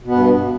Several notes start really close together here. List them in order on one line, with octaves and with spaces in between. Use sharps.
B2 B3 G2